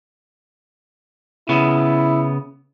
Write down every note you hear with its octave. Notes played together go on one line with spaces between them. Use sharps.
C#3 B3 E4